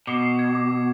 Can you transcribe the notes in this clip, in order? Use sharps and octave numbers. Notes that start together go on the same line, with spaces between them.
B2 D6
C7
G#6
D6
D6